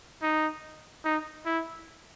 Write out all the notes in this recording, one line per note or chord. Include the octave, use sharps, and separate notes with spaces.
D#4
D#4
E4